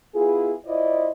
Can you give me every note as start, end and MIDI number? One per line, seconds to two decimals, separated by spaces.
0.15 0.54 59
0.15 0.54 64
0.15 0.54 65
0.15 0.54 68
0.66 1.11 64
0.66 1.11 65
0.66 1.11 72
0.66 1.11 74
0.66 1.11 75